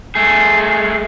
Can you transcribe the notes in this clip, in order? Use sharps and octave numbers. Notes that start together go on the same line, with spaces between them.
A3 G#4